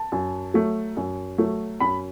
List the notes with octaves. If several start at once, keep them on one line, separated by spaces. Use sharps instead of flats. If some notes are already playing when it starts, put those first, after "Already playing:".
Already playing: A5
F#2
F#3 A3
F#2
F#3 A3
F#2 B5